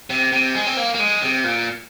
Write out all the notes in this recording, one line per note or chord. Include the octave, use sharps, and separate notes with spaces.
C3
C3
G#3
C4
A#3
A#3
G#3
C3
A#2